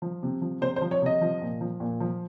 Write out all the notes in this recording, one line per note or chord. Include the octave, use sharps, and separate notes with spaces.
F3
C3
F3
C3 C5
C5
F3
C#5
C3 D#5
F3
A#2
F3
A#2
F3